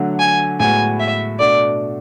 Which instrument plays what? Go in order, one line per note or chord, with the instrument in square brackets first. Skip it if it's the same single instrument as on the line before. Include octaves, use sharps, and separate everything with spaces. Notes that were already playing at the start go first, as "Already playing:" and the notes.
Already playing: [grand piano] D3 F#3 A3
[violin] G#5
[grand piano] A2 G#3 B3 F#4 [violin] G#5
[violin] E5
[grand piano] B2 A3 D4 F#4 [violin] D5